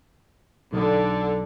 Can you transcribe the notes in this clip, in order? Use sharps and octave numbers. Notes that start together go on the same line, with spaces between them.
B1 D3